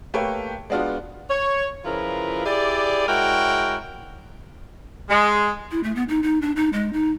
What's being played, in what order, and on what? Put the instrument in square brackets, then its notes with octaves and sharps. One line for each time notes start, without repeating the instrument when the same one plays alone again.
[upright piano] A3 A#3 G4 B4 C#5 G5
G#3 B3 D4 F4 F#4
[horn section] C#5
C#3 F3 E4 F4 A#4 B4
E4 G4 G#4 D5
G#3 E4 F#4 A#4 C#5 G5
[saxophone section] G#3
[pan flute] E4
A3
B3
D#4
D#4
D4
D#4
G#3
D#4